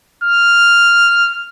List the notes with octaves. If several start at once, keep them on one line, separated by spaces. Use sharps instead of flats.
F6